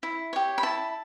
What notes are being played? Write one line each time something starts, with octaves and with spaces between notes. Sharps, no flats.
E4
G4 C#5
B5
E4 A5